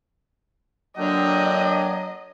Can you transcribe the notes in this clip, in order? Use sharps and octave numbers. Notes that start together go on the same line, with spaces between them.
D3 F#3 A#3 D4 D#5 G5